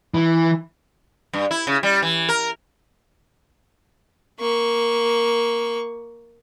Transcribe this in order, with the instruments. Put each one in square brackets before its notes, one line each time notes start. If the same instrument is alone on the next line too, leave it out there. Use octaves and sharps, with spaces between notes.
[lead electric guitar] E3
[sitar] G2
E4
C#3
G3
E3
A#4
[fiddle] A#3 C#6